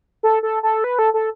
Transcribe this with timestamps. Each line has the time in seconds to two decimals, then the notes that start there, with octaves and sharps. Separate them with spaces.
0.23 A4
0.43 A4
0.63 A4
0.84 B4
0.99 A4
1.14 A4